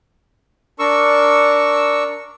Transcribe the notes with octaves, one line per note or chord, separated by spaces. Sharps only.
D4 A#4 C#6 E6